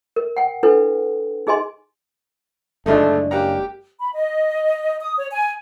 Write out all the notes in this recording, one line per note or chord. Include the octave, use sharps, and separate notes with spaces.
A#4
F#5 G5
D4 E4 A4 B4
D#4 G#4 D#5 G#5 C6
F#1 A2 D3 G#3 A3 D4 D#4
C#3 A#3 G4 F#5 A#5
B5
D#5
D#6
C#5
G#5